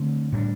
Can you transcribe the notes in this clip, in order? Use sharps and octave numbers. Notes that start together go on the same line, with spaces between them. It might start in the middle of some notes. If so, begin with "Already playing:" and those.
Already playing: D3 A3 C4
A2 G3 A#3 D4